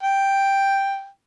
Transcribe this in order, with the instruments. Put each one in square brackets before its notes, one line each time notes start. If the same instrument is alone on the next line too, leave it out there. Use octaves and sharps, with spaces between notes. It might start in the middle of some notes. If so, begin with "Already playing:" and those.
[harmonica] G5